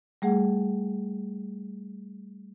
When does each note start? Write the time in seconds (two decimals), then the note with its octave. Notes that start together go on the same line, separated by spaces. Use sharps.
0.22 G3 A3 G#4 F#5